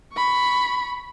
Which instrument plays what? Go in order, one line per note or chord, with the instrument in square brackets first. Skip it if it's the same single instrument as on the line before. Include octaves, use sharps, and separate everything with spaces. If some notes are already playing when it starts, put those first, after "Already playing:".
[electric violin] B5 C#6